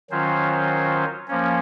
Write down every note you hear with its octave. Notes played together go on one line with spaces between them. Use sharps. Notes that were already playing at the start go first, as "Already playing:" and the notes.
D#3 F#3 C#4 F4 C5
F3 A#3 C#4